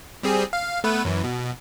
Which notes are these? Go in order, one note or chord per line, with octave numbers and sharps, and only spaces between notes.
G3 C4 G#4
F5
A3 B3 B4
F#2 E3
B2